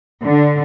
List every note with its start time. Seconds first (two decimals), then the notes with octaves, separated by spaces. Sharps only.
0.25 D3